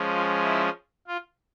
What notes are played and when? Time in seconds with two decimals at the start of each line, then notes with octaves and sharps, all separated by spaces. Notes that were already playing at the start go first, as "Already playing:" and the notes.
Already playing: F3 G#3 C#4
0.12 F4
0.43 E4
1.07 F4